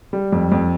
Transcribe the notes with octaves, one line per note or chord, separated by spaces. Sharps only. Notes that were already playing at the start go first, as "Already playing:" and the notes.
G3
F2
F2